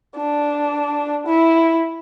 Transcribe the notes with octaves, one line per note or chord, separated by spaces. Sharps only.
D4
E4